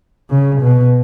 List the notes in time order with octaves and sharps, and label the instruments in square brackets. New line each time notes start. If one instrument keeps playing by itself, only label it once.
[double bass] C#3
B2